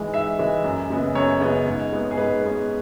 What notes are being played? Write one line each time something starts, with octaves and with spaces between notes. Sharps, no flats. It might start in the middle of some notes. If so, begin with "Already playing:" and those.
Already playing: G#2 E3 G#3
G#2 E5
E3 G#3
F#2
C#3 G#3 B3
F#2 C#5
C#3 G#3 B3
G#2
G#3 B3
G#4
G#2 B4
G#3 B3